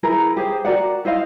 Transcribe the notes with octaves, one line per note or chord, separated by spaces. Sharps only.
E4 G#4 A#4 B4
G4 G#4 C5
F#4 A#4 D5 F#5
E4 C5 D#5 F5